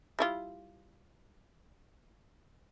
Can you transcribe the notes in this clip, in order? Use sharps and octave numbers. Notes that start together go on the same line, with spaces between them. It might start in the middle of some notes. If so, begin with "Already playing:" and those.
G3 E4 F4